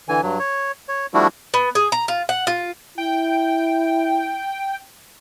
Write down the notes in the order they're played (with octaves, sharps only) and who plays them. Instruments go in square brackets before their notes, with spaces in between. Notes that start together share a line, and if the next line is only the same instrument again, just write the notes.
[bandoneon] D3 E3 G#5
G2 F#3
C#5
C#5
F3 G3 A3 D4 E4 F#4
[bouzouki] B3
G#4
A#5
F4
F#5
F4
[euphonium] E4 [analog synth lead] G5